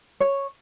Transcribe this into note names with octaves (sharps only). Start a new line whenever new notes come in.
C#5